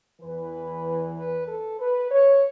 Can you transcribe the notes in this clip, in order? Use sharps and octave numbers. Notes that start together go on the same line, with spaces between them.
E2 E3 B4
B4
A4
B4
C#5